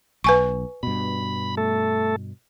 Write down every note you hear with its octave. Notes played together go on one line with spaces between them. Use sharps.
B1 B4 G#5 C#6
G2 B2 B5
A3 A4